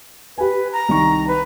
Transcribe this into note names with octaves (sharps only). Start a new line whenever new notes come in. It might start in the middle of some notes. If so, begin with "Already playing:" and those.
G4 B4 G#5
A#5
C2 D#3 C#6
B4